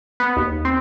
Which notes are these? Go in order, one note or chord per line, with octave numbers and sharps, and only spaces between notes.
B3
D#2
C4